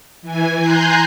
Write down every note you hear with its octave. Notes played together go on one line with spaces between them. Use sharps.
E3 G#5
G#5 A#5 C6 F#6 G6